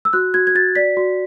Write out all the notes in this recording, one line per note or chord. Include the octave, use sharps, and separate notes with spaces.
E6
F#4 F#6
F#4 G#6
G#6
F#4 A6
D5 B6
F#4